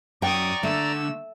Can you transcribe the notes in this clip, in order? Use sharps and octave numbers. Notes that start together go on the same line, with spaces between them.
F#2 D5 G5 A#5 C#6 D#6
D3 A3 E6